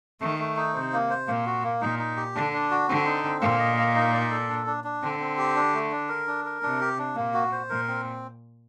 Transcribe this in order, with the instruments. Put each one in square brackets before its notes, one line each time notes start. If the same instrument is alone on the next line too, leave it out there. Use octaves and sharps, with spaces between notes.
[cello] D#3 [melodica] A3
[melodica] A3
D#4
[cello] C3 [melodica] C5
[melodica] A#3
C5
[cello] A#2 [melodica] A#3
[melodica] F#4
A#3
[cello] A#2 [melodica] D#4
[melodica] D#4
G4
[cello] D3 [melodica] D4
[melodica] D4
F#4
[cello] D3 [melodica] C4
[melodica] D#4
C4
[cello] A#2 [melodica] A#3
[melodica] D#5
A#3
D#4
D5
A4
D4
D4
D4
[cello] D3 [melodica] C4
[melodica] C4
G4
D4
A3
D4
A#4
D4
A#4
[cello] C3 [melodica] D4
[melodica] G4
D4
[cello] A#2 [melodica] A#3
[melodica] F#4
C5
[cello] A#2 [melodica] A#4
[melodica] C4